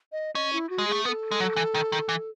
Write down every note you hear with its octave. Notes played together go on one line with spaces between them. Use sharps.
D#5
C#4 D#5
E4
F#4
G#3
A3 G#4
B3 B4
A4
G#3
F#3
E3
D#3
D#3
E3